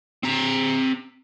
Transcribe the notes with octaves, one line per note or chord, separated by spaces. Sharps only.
C4 A#5